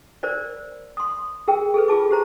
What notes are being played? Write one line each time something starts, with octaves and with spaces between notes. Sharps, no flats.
A#4 C5 D5
C6 D#6
G#4 A#4 G5
G#4 A4 B4
F4 G#4 A5 D6
G4 C5 A#5